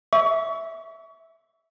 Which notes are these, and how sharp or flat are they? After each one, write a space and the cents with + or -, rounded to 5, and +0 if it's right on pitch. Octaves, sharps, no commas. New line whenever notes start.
E5 -10 C#6 +35